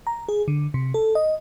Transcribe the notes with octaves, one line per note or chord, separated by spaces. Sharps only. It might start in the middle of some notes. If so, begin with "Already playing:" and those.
A#5
G#4
D3
C3
A4
D#5